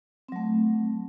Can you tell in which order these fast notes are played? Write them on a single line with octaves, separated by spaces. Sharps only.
C4 F#3 A3